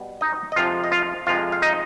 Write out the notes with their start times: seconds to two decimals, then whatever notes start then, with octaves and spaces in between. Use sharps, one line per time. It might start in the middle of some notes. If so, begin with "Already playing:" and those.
Already playing: B2 G3 B3
0.21 D#4 D#5
0.52 D#5
0.56 F2 C3 F3 G#3 F4 F5
0.84 D#5
0.92 F4 F5
1.27 F2 C3 F3 G#3 F4 F5
1.52 F5
1.62 D#4 D#5